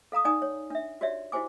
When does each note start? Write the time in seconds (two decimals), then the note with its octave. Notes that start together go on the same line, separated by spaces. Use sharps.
0.12 A4 F5 A#5 D#6
0.25 C#4 D#4 D5 G#5 A#5 D#6
0.42 C#5
0.70 D4 E5
1.01 F#4 G4 C#5 D5 E5
1.32 E4 F#4 G4 C5 G#5 D6